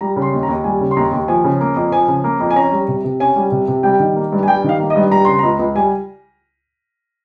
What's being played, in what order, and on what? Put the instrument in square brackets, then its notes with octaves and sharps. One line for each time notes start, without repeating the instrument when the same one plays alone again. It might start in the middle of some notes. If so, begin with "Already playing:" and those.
[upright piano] G3 [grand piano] A#5
[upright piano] C#3
[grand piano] C6
[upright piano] D#2
[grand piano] A#5
[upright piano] D#2
[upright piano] G3 [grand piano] G#5
[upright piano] C#3
[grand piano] C6
[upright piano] D#2 [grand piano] A#5
[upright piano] D#2
[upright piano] F3 [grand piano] G#5
[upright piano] C#3
A#3
F2
[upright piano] F3 [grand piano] G#5
[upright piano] C#3
A#3
F2
[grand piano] G#5
[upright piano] C#4 [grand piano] A#5
[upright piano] G3
C3
C3
[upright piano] C#4 [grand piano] G#5
[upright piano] G3
C3
C3
[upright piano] G3 [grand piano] G5
[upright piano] D#3
A#3
G2
[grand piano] G#5
[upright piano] G3 [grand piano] G5
[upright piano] D#3 [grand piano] F5
[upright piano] A#3
[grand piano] D#5
[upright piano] G2
[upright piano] G3 [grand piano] A#5
[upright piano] C#3 [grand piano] C6
[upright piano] C#2 [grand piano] A#5
[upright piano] C#2
[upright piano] G3 [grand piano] G#5